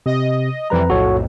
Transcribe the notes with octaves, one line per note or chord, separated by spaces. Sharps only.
C3 D#5
F2 C3 E3 G3 B4 A#5
B1 F2 A2 F#4 A4 C#5